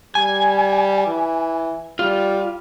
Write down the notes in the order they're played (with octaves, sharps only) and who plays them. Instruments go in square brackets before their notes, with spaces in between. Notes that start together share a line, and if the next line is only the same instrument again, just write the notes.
[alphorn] G3 [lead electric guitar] G#5
[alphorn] E3
[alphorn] G3 [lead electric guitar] F4